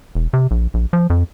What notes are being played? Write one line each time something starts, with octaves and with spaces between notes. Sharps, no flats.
E1
C3
A#1
A#1
F3
F2